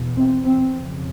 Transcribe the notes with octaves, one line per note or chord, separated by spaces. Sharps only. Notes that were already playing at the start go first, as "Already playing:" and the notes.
Already playing: E2 B2
C4
C4
F2 C#3